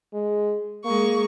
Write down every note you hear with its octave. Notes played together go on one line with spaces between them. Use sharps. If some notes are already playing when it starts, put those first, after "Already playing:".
G#3
G#3 A#3 C#6